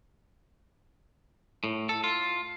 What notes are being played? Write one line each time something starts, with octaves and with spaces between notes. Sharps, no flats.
A2
A4
F4